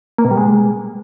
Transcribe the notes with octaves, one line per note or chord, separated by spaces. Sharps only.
A#3
B2
G3
G#3